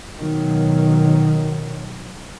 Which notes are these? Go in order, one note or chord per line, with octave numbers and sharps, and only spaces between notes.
B2 D#3 F#3